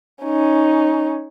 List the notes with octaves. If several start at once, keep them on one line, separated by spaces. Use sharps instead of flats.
C#4 D#4